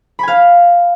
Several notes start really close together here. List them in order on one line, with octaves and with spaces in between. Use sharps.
B5 G#5 F5